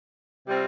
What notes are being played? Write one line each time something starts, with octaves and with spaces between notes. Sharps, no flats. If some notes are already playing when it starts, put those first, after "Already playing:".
C3 G3 C4 F4